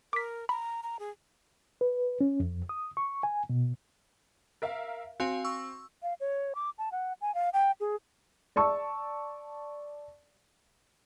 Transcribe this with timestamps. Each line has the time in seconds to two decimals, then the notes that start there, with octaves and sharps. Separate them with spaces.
0.13 A#4 D6 B6
0.49 A#5 B5
0.83 A#5
0.99 G#4
1.81 B4
2.21 C#4
2.40 F2
2.69 D#6
2.97 C#6
3.23 G#5
3.50 B2
4.62 A#4 E5 F5
5.20 C4 F#4 F5 G#5
5.44 C#6 E6
6.03 F5
6.20 C#5
6.55 D6
6.78 A5
6.92 F#5
7.21 G#5
7.35 F5
7.53 G5
7.81 G#4
8.56 D5 A5 C#6 E6